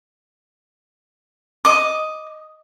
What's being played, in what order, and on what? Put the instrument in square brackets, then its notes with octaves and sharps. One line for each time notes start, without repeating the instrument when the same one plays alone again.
[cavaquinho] D#5 D6